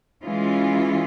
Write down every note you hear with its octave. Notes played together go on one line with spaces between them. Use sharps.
E3 G#3 C#4 F4